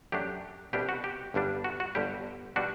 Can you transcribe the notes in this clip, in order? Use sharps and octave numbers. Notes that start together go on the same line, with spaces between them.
F#2 F#3 A3 D4 G4
C2 B2 G3 D4 G4
F#4
G4
G1 G2 D3 G3 D4
F#4
F#4
G1 G2 D3 G3 G4
B2 G3 D4 F#4